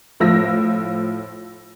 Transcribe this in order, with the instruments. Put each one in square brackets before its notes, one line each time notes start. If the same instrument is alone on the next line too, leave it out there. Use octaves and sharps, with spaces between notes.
[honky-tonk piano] A2 F3 E6 A#6